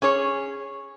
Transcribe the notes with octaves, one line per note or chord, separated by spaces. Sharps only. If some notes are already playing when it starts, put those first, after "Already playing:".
C#4 G#4 C#5